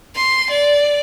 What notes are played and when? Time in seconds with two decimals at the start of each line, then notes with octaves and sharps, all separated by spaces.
0.16 C6
0.50 D5